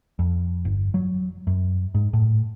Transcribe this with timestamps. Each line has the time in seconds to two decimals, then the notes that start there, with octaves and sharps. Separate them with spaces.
0.19 F2
0.65 G1
0.94 F#3
1.47 F#2
1.95 G#2
2.13 A2